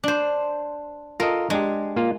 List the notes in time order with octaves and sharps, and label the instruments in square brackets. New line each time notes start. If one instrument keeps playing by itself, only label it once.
[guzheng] D4 C5
[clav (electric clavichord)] F4 A4 D#5 [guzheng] A#4
[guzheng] G#3 [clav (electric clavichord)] D4 G4
[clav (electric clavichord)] A#3 F4